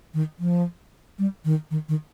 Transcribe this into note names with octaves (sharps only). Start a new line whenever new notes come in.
D#3
F3
G3
D#3
D#3
D#3